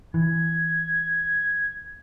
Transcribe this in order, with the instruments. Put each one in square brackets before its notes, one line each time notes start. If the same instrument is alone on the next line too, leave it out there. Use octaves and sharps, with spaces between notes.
[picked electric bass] E3 [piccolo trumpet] G#6